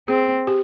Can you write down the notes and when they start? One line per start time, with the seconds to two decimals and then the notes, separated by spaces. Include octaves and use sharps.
0.08 C4 G#4
0.47 G4